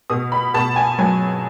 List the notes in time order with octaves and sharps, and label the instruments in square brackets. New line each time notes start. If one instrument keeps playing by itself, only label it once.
[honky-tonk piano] B2 D#6
B5
B2 A5
G#5
F#3 G#5